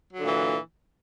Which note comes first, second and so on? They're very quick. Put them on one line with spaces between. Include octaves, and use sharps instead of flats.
F#3 D3 A#2 E3